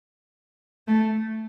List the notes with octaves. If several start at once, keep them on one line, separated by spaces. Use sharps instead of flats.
A3